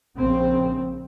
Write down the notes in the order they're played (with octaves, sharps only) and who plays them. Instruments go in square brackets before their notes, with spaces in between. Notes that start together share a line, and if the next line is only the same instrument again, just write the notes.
[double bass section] A#1 C#3 C4